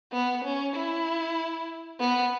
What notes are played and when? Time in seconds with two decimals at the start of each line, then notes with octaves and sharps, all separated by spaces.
0.13 B3
0.44 C#4
0.76 E4
2.00 B3